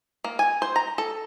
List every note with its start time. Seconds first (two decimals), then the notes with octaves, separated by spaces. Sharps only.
0.24 A#3
0.39 G#5
0.62 C5
0.76 A#5
0.98 A4